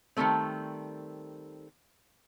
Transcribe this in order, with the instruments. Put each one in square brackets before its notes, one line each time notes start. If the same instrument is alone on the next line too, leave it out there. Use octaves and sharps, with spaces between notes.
[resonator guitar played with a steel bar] D#3 F3 G3 A3 C4